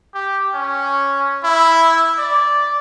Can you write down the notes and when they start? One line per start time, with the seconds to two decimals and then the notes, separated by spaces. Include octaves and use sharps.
0.15 G4
0.55 C#4
1.44 E4
2.18 D5